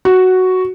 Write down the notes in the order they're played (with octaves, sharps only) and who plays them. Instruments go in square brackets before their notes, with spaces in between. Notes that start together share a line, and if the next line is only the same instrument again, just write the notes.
[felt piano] F#4